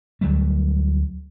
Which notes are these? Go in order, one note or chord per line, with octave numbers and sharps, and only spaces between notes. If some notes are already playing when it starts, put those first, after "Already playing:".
D2 F#3 G3 A3